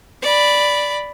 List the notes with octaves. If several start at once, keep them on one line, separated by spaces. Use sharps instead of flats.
D5 B5